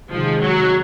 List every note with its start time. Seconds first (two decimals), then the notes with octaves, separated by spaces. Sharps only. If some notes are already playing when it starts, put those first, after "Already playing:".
0.11 C3 D#3 F3 G#3
0.40 F#3